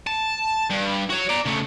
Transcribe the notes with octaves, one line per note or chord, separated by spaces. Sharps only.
A5
G2
F#4 C#5
D5 A#5
C#3 A3